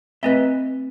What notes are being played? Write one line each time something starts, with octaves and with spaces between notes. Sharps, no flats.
A3 C4 B4 D#5 E5